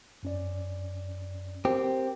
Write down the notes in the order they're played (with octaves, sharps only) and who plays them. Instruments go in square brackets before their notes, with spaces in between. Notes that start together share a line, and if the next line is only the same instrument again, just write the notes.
[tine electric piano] F#2 C#4 D5
[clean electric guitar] C4 G4 [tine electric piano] A#4